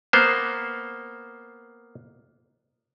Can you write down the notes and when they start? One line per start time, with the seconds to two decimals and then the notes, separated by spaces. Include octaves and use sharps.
0.13 A#3 B3 C5